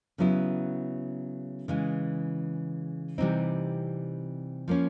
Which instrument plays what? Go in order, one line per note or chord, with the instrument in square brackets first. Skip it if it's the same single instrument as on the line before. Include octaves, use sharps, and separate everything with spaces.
[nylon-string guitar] C#3 F#3 B3 E4
C#3 E3 G#3
C3 E3 G3 C4 D#4
F3 A#3 C#4